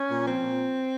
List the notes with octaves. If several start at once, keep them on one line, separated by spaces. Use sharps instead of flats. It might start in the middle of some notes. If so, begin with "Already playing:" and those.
Already playing: C#4
A#2
F3 C4
A#2